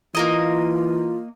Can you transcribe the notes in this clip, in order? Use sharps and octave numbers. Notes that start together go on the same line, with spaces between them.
E3 A#3 F4 A#4 D#5